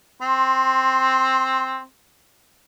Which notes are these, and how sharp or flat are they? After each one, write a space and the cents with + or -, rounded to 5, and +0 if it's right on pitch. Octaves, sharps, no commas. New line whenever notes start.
C4 +5 C6 +20